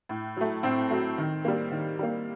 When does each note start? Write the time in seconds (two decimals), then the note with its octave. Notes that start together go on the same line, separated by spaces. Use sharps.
0.09 A2
0.37 F#3 A3
0.63 A2 C4
0.90 F#3 A3
1.18 D#3
1.45 G3 A#3
1.72 D#3
1.99 G3 A#3